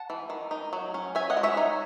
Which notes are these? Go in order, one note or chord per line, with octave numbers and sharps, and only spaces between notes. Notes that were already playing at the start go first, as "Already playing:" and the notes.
Already playing: F#5 A5
E3
D#3
D#4
F#3
C#4
C#4 E5 G#5
D#5 F#5
G#3
C#5 E5
D#4